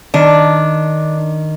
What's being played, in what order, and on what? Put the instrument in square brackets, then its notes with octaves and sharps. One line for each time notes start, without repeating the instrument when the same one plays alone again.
[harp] D#3 [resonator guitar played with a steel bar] D4